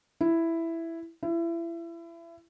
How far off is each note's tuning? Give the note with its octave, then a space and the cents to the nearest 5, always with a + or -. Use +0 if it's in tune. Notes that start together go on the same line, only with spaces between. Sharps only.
E4 +5
E4 +30